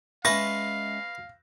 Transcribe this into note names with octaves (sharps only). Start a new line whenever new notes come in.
G#3 C#4 B4 E5 F5 A5 C#6 A#6